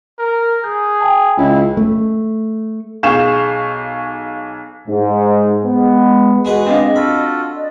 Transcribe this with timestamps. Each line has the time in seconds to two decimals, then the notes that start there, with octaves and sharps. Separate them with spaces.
0.18 A#4
0.64 G#4 G6
1.01 G5 A5
1.37 C#2 E4
1.77 A3
3.03 B1 G#4 F5 C#6 G6 E7
4.87 G#2
5.65 G#3 B3
6.45 G#3 F#4 G#4 B4
6.66 C4 D4 D#5 F5
6.96 F4 F#4 A4 B5
7.55 D5 D#5